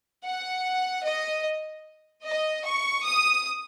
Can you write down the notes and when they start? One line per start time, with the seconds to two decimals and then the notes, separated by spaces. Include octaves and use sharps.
0.24 F#5
1.04 D#5
2.24 D#5
2.64 C#6
3.04 D#6